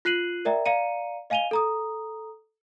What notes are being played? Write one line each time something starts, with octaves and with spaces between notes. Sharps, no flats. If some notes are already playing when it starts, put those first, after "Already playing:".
F4 F#6 C7 D#7 F#7
A#4 D5 E5 G5 A#5
D5 F5 A#5 C#7 D#7
D#5 F5 G#5 D#7 F7 G7
A4 A#5 D#6